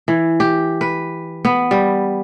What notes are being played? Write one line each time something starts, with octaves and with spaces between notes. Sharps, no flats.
E3
G4
B4
B3
G3